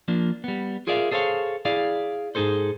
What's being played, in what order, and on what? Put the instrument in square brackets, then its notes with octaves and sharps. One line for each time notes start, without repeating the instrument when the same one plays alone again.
[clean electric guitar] F3 A#3 D4
G3 B3
F4 G#4 A#4 D5 E5 F5
G#4 A4 C5 C#5 F5
E4 G#4 D5 F5
G#2 D#4 G#4 A4 C5